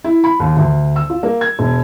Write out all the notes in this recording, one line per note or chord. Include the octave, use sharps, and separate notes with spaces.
E4
B5
D#2
D2
E6
F4
A#3
G#6
E1